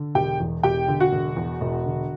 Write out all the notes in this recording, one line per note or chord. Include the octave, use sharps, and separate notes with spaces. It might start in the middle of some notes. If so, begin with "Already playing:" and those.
Already playing: D3
E1 G4 G5
E2
E1 G4 G5
D3
F#4 F#5
E1
E2
E1
D3